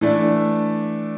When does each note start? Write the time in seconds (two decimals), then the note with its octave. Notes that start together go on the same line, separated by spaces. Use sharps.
0.01 E3 A3 D4